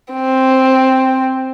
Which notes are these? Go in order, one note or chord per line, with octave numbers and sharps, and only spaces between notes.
C4